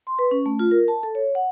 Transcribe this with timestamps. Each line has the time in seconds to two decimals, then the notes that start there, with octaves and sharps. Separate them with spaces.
0.07 C6
0.19 B4
0.31 C#4
0.46 A3
0.59 F4
0.71 A#4
0.88 A5
1.03 A4
1.15 C#5
1.35 F#5